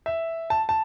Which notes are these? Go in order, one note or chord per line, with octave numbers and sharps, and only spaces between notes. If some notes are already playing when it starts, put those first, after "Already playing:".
E5
A5
A5